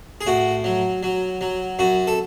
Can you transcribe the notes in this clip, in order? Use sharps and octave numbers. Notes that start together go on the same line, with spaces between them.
G#4
A2 F#4
F#3
F#3
F#3
F#2 F#4
A4